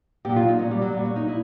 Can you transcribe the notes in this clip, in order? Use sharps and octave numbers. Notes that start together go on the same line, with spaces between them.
A#2 F#3 G4
F4
D#4
A#2 F#3 C#4
G3
F#3
A#2 F#3 G3
C#4
D#4
A#2 E4